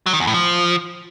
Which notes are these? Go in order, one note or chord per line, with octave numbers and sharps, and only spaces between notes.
F#3
D#3
E2
A2
F3